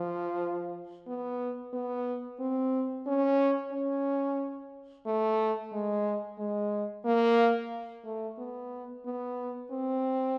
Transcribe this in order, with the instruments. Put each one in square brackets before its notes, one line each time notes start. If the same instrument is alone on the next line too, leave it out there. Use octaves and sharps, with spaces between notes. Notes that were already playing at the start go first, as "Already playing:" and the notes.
Already playing: [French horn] F3
B3
B3
C4
C#4
C#4
A3
G#3
G#3
A#3
A3
B3
B3
C4